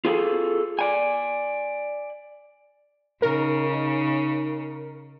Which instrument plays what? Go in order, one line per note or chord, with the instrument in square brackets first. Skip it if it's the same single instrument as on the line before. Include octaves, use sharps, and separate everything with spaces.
[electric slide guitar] F4 G#4 A4
D5 G#5
[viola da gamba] C#3 [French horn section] D#4 [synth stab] A#4